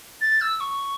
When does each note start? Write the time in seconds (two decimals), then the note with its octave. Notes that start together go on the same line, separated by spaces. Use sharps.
0.21 A6
0.41 E6
0.60 C#6